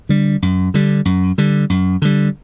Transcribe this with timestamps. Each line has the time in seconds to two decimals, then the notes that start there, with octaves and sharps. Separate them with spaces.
0.09 D3 G3
0.42 F#2
0.74 D3 G3
1.05 F#2
1.38 D3 G3
1.70 F#2
2.02 D3 G3